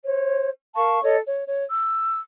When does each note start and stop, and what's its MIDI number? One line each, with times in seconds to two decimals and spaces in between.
0.05 0.49 72
0.05 0.49 73
0.75 1.01 70
0.75 1.01 77
0.75 1.01 81
0.75 1.01 85
1.03 1.17 69
1.03 1.17 73
1.03 1.17 75
1.25 1.44 73
1.47 1.63 73
1.69 2.18 88